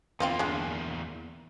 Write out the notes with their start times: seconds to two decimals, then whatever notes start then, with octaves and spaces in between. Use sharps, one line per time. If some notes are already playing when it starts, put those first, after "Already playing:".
0.20 E2 A#3 C4 F4 G5
0.39 G#3 D4